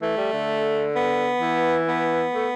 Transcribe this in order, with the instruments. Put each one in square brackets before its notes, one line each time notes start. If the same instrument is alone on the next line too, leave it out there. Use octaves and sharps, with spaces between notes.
[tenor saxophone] E3 [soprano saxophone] A3
[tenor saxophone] G3
D3
[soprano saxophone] B3
[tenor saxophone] E3
[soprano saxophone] B3
[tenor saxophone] A3